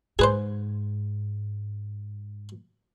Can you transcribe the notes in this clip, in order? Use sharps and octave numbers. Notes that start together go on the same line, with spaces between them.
G#2 G#4 B4 C5